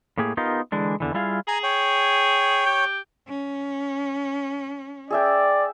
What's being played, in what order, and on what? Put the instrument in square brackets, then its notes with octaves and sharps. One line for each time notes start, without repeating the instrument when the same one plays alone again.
[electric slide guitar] A2 A#3 G4 G#4
B3 D#4 F4 G4 A#4
D3 E3 G#3 D4
E2 D3 E3
G3 E4 F4 G#4 F5
[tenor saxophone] G#4 [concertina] G#5 A#5
[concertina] C#5 G5
[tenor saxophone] G4
[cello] C#4
[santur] G#4 E5 G5 [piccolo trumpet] D5